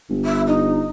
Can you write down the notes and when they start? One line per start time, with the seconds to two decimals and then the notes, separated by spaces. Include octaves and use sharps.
0.09 G1
0.25 E5
0.47 D#4